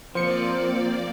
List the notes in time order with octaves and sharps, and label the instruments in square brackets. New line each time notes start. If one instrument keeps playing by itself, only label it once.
[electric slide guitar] F3 [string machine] A#3 D5 [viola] C4 [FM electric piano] C5 C#7